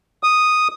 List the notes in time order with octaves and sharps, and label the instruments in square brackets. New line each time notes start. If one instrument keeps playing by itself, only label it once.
[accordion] D#6